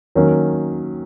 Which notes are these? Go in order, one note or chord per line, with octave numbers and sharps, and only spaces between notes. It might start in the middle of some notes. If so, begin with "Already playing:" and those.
D#3 F#3 A#3 C#4